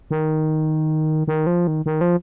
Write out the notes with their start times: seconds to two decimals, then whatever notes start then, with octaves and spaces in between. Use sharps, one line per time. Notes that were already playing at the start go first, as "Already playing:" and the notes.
0.11 D#3
1.28 D#3
1.47 F3
1.67 D#3
1.86 D#3
2.01 F3